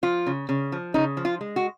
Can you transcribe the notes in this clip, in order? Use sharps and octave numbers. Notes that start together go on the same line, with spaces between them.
F3 F4
C#3
C#3
F3
C#3 D#4
F3
F4
G#3
F#4